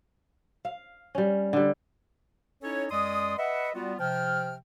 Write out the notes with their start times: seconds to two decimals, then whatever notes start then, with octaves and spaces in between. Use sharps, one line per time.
0.65 F5
1.15 G3 C#4
1.53 D3 G3
2.63 C#4 D#4 E4 A4 C#5
2.91 F#2 G#3 D5 C6 D#6
3.38 B4 D#5 E5 F#5
3.75 G3 B3 F4 F#4
3.99 C3 F3 G5 F6